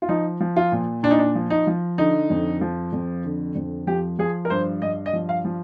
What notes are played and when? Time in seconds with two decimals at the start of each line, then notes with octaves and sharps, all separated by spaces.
0.02 F4
0.09 F3 D#4
0.40 F3
0.56 F4
0.72 A#2
1.03 A#2 D4
1.11 D#4
1.19 D4
1.35 F3
1.50 D#4
1.67 F3
1.98 D3 D#4
2.30 F2
2.61 F3
2.93 F2
3.25 D3
3.56 F2
3.87 F3 G4
4.19 F3 G#4
4.45 A#4
4.50 G2 C5
4.82 G2 D#5
5.06 D#5
5.13 F3
5.29 F5
5.45 F3